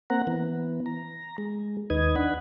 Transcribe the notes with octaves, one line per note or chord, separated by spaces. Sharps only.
A#3 C4 F#5 A#5
E3 B3
A#5
G#3
D#2 D#4 B4 D#6 G#6
D4 F#5 B5